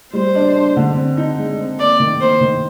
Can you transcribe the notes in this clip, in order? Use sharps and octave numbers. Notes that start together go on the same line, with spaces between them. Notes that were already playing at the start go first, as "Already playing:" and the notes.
G3 C5
D4
D4
D3
C4
D#4
G#3
C4
A#3 D5
D#3
A#3 C5
D#3